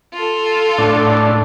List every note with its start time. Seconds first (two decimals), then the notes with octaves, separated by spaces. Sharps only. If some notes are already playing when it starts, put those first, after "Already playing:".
0.13 F4 A4
0.78 A2 D4